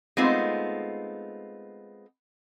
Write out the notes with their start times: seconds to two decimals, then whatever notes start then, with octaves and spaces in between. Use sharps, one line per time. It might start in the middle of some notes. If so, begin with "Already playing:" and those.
0.17 G#3 A3 B3 C4 D#4 F4